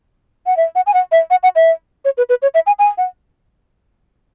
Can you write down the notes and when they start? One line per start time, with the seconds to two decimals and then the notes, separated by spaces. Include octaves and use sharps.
0.46 F#5
0.57 E5
0.75 F#5
0.87 G#5
0.94 F#5
1.12 E5
1.31 F#5
1.43 F#5
1.56 E5
2.05 C#5
2.17 B4
2.29 B4
2.42 C#5
2.54 E5
2.67 G#5
2.79 G#5
2.98 F#5